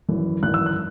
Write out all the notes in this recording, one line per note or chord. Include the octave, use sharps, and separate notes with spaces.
G#1 F#2 E3
G#1 F#2 E3 F#6
E6
F#6